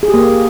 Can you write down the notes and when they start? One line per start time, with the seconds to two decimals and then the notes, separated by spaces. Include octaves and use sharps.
0.03 G#4
0.08 G4
0.14 A#3